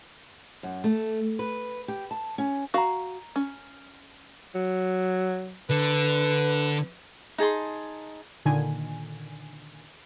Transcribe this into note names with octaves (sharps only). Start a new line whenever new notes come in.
F#2
A3
B4
G4
A5
C#4
F#4 F5 A#5 C#6
C#4
F#3
D3 B4
D#4 G#4 A5 C6
A#2 D3 D#3 G#5